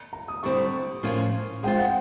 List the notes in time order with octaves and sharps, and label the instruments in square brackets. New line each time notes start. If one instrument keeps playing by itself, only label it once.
[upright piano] A#5
D#6
[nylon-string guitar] D3 G3 C4 E4 [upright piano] C#6
[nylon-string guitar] A2 F3 A#3 C#4 F4
[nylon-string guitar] G#3 C4 F4 [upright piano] G5
[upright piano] F#5